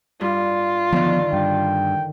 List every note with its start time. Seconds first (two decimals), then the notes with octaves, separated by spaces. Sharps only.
0.21 G2 F4
0.93 D3 D#3 F3 B3
1.33 G2 G5